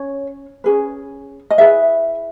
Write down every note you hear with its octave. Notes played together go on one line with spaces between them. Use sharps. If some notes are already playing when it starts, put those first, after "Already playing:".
Already playing: C#4 C#5
C#4 G#4 B4
D#5
E4 G#4 B4 E5